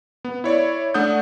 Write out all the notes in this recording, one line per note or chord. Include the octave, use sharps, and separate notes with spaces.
B3
E4 C#5 D5
A3 D4 F#5 D#6 G6